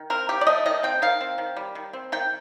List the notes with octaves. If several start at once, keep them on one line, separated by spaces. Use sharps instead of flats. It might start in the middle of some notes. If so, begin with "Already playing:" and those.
Already playing: D#3
C4 A#4
D#3 G4
D5
A3 D#5
D#3 D#5
C4 G5
D#3 F5
C4
D#3
G3
D#3
C4
D#3 G5